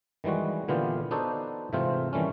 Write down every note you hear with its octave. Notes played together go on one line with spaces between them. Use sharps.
D#3 E3 G3 G#3 F#4
A#2 D3 E3 B3 F4 G4
B3 D4 D#4 F#4 A4 C5
G#2 C3 E3 A3 C4 F4
D#3 E3 G3 A3 C#4